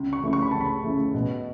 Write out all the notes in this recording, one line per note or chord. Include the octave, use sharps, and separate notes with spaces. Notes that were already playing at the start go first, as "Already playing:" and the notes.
Already playing: C#2
C#6
C#3 A3 E4
C#6
B5
C#2 A5
B5
C#3 A3 E4
B2